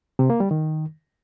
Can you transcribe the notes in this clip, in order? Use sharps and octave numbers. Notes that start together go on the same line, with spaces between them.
C3
A#3
G3
D#3